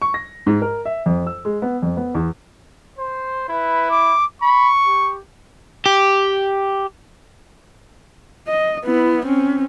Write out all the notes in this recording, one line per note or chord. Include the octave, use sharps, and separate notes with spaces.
C#6
A#6
G#2
A#4
E5
F2
E6
G#3
B3
F2
B3
E2
C5
E4 B4
D6
B5 C#6
G4
G4
D#5
B3 E4
C4 C#4